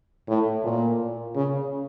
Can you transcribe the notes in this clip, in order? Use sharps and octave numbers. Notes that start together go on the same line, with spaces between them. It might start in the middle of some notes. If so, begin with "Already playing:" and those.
A2
A#2
C#3